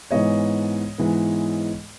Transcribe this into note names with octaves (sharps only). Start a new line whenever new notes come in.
G#2 E3 G#3 B3 C#5 D#5
G#2 E3 G#3 B3